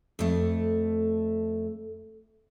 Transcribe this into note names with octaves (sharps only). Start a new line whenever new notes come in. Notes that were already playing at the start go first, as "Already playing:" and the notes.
F2 A3